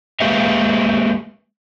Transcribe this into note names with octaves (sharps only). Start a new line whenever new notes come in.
G#3 A#3 G4 B4 E5 F5